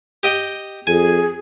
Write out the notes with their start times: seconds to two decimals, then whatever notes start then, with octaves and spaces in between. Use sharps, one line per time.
0.23 G4 D#5 G5
0.87 F2 G#4 G#5